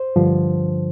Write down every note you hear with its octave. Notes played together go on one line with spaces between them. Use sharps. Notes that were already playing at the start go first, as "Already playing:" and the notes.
Already playing: C5
G2 D3 F3